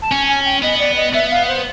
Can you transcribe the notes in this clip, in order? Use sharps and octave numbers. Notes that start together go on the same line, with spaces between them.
A5
C#4 G#5
G#5
G5
B3 D#5
D5
D#5
B3 E5
F5
C5